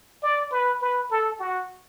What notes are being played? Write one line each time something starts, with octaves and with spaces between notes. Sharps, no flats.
D5
B4
B4
A4
F#4